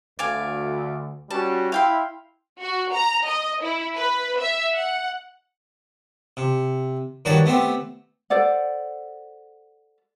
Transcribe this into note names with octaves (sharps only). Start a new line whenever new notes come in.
D2 D5 F5 G#5
G3 C#4 F#4 A5
E4 F5 G5 C6
F#4
A#5
D#5
E4
B4
E5
F#5
C3
G2 D#3 D4 F#4 C#5 D5
A3 B3 C4 G4
A4 C5 D5 F#5